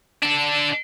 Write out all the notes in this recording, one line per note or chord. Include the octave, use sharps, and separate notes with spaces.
D4 A4